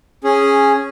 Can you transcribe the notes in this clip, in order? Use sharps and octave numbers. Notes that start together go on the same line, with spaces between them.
C#4 G#4